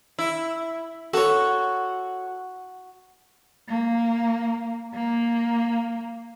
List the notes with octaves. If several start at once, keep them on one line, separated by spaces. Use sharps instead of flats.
E4
F#4 A4 C#5
A#3
A#3